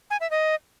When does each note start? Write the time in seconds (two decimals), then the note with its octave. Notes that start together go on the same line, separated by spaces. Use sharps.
0.10 G#5
0.21 E5
0.31 D#5